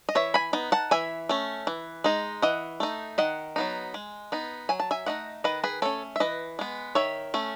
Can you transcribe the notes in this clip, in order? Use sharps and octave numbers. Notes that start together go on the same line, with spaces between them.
D#5
E3 C#5 E5
G#5 B5
B3 D#4
F#5 A5
E3 E5 G#5
A3 C#4
E3
G#3 D#4
E3 D#5 F#5
A3 D#4
D#3 D#5 F#5
F#3 B3 D#4
G#3
B3 D#4
F#3 G#5
A5
E5 G#5
A3 D#4 D#5 F#5
D#3 B4 D#5
G#4 B4
A3 C#4 A4 C#5
E5
E3 B4 D#5
G#3 B3
D#3 C#5 E5
A3 C#4